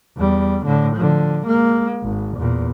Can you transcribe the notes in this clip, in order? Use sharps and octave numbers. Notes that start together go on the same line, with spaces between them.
E2 G3
A2 D3
D3 F3
G#3 A#3
G#1
E2 A#2